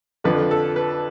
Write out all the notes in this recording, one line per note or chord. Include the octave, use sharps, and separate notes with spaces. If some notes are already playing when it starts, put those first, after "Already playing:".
F2 D3 F3 B4
A4
B4